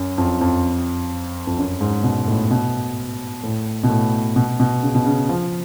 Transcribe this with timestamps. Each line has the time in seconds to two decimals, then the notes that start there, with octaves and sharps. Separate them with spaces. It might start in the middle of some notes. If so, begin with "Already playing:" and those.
Already playing: F#2
0.18 F2
0.41 F2
1.47 F2
1.58 F#2
1.81 G#2
2.03 B2
2.27 A2
2.51 B2
3.43 A2
3.83 B2
3.89 A2
4.36 B2
4.60 B2
4.83 C#3
4.95 B2
5.06 C#3
5.29 F3